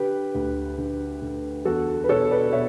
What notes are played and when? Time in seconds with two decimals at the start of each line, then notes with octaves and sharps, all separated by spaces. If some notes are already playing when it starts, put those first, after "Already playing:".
Already playing: D3 G4 B4
0.35 D2
0.78 D3
1.22 D3
1.65 E2 F#4 A4
2.04 B4
2.09 B2 A4 C#5
2.31 B4 D5
2.52 B2 C#5 E5